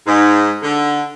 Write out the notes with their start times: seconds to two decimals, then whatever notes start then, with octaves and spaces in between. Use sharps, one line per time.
0.07 G#2
0.63 D3